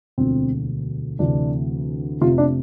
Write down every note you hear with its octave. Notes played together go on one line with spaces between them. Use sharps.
E1 D2 D3 F3 C4
D2 C3 E3 D4
F1 F2 C3 F4
D4